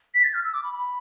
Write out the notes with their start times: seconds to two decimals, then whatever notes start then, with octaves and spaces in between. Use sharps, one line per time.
0.14 B6
0.24 A6
0.34 F6
0.44 E6
0.54 D6
0.64 B5
0.74 B5